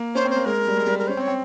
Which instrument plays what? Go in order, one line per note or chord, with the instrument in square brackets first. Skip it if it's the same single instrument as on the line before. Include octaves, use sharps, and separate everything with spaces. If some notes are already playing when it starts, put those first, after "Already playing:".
Already playing: [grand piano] A#3
[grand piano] C#4 [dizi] C5
[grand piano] C4
[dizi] C5
[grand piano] A#3
[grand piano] G#3 [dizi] A#4
[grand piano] G3
G#3
G3
[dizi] A#4
[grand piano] C#4 [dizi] C5
[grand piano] C4
[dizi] C#5
[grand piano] C4